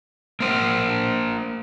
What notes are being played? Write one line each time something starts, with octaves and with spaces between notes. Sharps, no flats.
A#3 C5